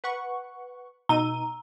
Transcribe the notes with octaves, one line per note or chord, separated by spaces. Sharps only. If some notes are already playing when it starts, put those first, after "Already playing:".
B4 F#5 C#6
B2 D#4 A#5 D#7